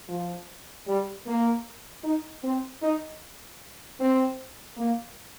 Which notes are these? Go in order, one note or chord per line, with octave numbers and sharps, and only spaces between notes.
F3
G3
A#3
D#4
C4
D#4
C4
A#3